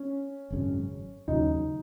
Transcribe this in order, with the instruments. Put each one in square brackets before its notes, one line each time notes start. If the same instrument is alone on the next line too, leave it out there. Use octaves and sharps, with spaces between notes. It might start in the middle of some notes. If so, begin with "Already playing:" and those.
Already playing: [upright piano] C#4
[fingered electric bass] G#1 F#2 C#3
[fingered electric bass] D#2 C#3 F#3 [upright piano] D#4